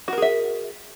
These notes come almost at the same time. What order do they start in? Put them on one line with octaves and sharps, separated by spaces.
F#4 A#4 G#4 E5